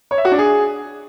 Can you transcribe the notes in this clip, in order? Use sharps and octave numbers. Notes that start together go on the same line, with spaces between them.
C#5
E5
F#4
D4
G#4